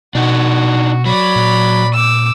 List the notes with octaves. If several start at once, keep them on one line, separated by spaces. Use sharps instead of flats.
B2 D4 D#4 F#4 F#5
F#3 D5 B5
A#2
D6 E6